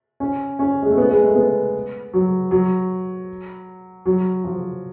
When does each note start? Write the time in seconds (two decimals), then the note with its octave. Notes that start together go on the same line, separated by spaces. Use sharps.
0.20 C#4
0.59 C#4
0.82 G#3
0.90 A3
0.97 B3
1.10 G#3
1.23 A3
1.36 B3
2.13 F#3
2.51 F#3
4.06 F#3
4.44 F3